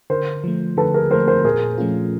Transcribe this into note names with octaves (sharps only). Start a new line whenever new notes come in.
D3 A#4 C5
F3 A3
D3 A4 B4
G#4 A#4
F3 A3 A#4 C5
A#4 C5
A#2 G#4 A#4
F3 A3 C#4 F4